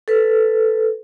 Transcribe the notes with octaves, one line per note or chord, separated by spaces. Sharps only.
A4 B4